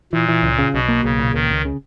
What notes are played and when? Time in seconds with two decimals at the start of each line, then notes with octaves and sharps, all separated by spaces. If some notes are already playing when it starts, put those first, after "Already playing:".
0.13 A#2 E3
0.28 E3
0.43 C#2
0.59 C#3
0.74 B1 B2
0.88 A#3
1.04 B1 C#3
1.19 A#2
1.34 C#2 D#3
1.50 C#2
1.65 C#3